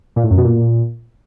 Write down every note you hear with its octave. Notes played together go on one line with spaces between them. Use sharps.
A#2
A2
F#2
B2
A#2